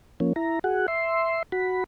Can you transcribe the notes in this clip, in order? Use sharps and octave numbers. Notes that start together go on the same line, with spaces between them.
F3 A#3 C#4
E4 A#5
F#4 G#4 F#5
E5 C6
F#4 B5